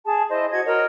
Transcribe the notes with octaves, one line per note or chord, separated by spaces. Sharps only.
G#4 A5
E4 C5 D#5
F#4 D#5 G#6
F#4 A#4 C#5 D#5